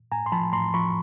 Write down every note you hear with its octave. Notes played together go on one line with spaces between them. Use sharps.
A2 G#5 A#5
C6
F3 A5 B5
A2 A#5 C6
F3 B5 C#6